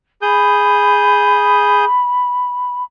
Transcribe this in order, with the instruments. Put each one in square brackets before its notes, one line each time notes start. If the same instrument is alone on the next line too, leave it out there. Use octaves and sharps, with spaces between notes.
[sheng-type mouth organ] G#4 D#6 G6 [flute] B5